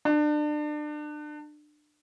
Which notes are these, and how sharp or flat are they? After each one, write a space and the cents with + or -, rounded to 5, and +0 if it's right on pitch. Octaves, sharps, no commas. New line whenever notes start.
D4 +30